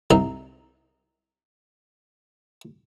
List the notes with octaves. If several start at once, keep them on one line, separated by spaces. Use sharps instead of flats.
C2 D#4